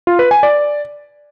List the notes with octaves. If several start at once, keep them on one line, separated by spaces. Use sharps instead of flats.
F4
B4
G#5
D5